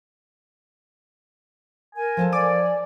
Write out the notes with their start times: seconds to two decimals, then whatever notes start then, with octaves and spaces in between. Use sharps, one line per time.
1.95 A#4 G#5
2.17 F3 A4 A5
2.32 D5 G#5 D6